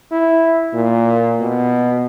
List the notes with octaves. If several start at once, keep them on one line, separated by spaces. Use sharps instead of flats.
E4
A#2
B2